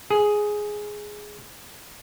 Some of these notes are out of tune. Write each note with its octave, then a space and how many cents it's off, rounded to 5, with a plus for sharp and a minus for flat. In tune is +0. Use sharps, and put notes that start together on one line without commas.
G#4 +5